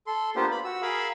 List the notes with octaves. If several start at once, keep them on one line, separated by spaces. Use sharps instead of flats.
A4 C6
A#3 B3 D4 F4 G4 C5
B5
F#4 E6
G#4 A#4 F5 B5 E6